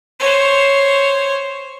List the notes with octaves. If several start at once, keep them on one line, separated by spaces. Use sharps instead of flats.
C5 C#5